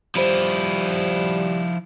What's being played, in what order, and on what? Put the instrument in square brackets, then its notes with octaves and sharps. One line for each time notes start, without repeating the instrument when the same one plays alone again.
[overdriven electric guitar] F3 E4 [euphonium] G3 [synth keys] C5 B5 D7